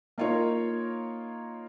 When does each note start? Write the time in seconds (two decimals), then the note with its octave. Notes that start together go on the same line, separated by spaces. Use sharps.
0.18 A#3 D#4 F4 A#4 C#5